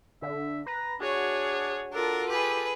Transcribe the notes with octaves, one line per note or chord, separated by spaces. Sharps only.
D3 E5
B4 A#5
D4 F#4 G#4 C#5
D4 F4 A4 A#4
G4 G#4 B4